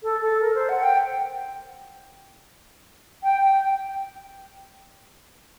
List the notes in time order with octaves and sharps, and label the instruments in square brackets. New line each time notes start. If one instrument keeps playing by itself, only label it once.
[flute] A4
A4
A#4
C5
F#5
G5
G5
G5